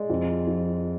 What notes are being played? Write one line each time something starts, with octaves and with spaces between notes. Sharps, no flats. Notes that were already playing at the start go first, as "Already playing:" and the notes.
Already playing: G#3 D5
F2
F3